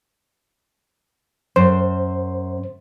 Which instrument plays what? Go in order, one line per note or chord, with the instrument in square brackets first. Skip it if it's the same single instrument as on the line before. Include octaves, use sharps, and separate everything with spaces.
[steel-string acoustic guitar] F#2 [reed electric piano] C5